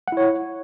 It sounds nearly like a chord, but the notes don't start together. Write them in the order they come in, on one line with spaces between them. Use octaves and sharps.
F#5 E4 C#5